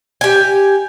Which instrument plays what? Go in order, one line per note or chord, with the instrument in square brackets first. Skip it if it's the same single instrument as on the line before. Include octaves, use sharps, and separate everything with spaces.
[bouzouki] G4 G#5